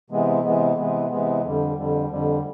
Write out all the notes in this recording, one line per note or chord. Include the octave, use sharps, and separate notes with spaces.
C3 E3 G#3 B3
C3 E3 G#3 B3
C3 E3 G#3 B3
C3 E3 G#3 B3
F2 D3 G3
F2 D3 G3
F2 D3 G3